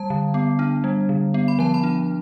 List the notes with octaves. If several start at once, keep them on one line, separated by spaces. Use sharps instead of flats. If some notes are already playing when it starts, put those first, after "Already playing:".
Already playing: G3 A5
D3
B3
D4
G3
D3
B3
B5
F3 A5
B5
D4